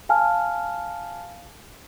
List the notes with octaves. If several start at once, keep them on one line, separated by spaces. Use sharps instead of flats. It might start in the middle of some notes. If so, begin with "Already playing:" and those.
F5 G#5 A5 F6